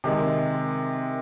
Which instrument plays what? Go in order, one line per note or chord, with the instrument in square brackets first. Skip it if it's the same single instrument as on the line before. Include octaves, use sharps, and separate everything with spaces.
[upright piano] C3 D#3 G#3